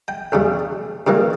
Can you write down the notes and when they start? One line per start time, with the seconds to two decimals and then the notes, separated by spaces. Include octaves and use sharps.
0.08 G5
0.32 E2 C#3 G3
1.07 C#3 E3 G3 A#3